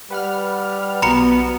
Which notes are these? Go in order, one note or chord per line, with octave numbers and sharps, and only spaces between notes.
G3 B4 F#5 F6
B1 B3 F#4 A#5 B5 C#7